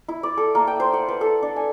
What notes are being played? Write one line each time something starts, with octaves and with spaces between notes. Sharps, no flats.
E4
D5
A4
A#3
G5
C5
F#5
B4
A4
D4
G#5